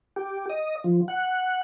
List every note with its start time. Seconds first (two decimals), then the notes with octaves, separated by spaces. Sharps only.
0.16 G4
0.49 D#5
0.84 F3
1.08 F#5